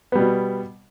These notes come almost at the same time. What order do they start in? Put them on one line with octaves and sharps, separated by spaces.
B3 G3 B2